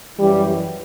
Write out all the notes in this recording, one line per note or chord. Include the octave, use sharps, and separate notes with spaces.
F#2 E3 G3